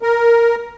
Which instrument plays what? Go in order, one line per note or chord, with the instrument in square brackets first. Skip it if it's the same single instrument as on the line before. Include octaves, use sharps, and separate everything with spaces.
[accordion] A#4